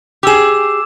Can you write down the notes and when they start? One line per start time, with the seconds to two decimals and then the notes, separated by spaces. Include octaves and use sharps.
0.23 G4 G#4 D6 E6 E7